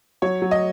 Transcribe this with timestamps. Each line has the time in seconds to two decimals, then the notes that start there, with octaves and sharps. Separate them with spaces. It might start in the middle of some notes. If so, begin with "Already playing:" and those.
0.22 F#3 C#5
0.42 F#3
0.51 D#5